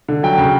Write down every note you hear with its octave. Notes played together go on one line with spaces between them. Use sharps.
D3
F#3 G5
C#3